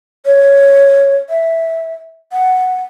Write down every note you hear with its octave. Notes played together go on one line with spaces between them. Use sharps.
C#5
E5
F#5